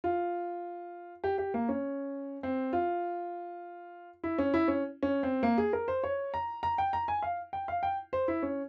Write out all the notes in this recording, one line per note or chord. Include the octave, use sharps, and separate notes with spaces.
F4
G4
G4
A#3
C#4
C4
F4
E4
C#4
E4
C#4
C#4
C4
A#3
G#4
A#4
C5
C#5
A#5
A#5
G5
A#5
G#5
F5
G5
F5
G5
C5
E4
C#4